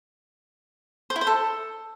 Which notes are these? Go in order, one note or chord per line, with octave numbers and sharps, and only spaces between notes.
C5
E4
C5
A4